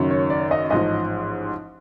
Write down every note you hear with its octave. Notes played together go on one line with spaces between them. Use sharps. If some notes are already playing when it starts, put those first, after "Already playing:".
Already playing: F#1 F#2 D#3
C#5
D5
D#5
A1 G#2 F3 D#5